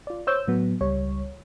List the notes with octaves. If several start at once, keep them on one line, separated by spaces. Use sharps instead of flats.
F4 D5
C5 C#5 E6 G6
A2 F#3 B3
C#2 G3 C#5